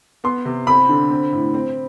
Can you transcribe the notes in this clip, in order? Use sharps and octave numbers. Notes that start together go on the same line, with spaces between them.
B3 C6
C3
C4 B5
D3
C4
A2
C4